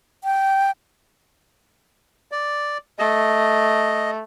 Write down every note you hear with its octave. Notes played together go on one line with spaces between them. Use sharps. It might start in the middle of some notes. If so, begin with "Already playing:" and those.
G5
D5
A3 D#5